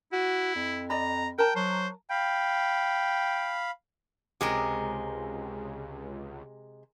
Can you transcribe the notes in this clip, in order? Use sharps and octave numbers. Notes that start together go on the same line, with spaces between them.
E4 F#4
F2
D5 D#5 A#5 B5
A#4 G5 A5 A#5
F#3 C5
F5 G5 B5
C#2 C3 G#3 G#4 A#4